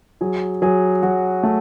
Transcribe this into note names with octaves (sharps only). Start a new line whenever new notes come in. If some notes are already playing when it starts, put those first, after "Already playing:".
F#3 G#4
F#3 G#4
F#3 F#4
A3